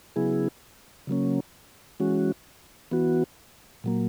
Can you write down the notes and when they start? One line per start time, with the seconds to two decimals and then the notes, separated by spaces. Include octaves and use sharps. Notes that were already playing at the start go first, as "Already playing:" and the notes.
0.16 C#3 F#3 B3 E4 G#4
1.07 C#3 F#3 A#3 C#4
2.00 E3 G#3 C#4 F#4
2.91 E3 B3 F#4
3.84 A#2 F#3 A#3